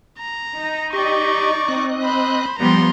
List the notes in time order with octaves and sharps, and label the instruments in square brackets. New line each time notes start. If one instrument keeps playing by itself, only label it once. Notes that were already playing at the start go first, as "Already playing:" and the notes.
[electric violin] A#5
[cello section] D#4
[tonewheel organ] G4 D#5 [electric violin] D5 C#6
[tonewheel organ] C4 D#5 F#6
[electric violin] C5 B5
[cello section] F3 G3 B3 [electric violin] A#5 C6